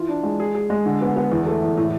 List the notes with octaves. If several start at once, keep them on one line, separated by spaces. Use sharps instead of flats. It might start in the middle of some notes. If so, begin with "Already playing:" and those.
Already playing: E3 F4
D4
G#3
G#4
G#4
G#3
D3
B3
B3
E2
A3
E2
A2